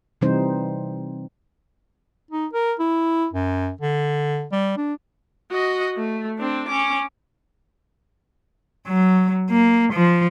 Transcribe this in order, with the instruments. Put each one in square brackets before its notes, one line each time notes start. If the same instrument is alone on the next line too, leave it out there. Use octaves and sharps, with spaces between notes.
[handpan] C3 E3 G3 C4 D#4 C5
[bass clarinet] D#4
A#4
E4
F#2
D3
G3
D4
[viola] F#4 D#5
A3
C4 D4
C#4 D6
[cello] F#3
A#3
F3